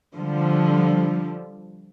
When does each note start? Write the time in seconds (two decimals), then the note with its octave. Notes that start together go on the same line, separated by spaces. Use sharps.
0.16 D3 F3 G3